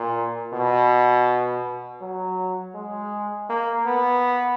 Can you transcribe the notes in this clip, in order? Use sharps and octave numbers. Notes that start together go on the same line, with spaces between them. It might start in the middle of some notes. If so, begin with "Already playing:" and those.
Already playing: A#2
B2
F#3
G#3
A#3
B3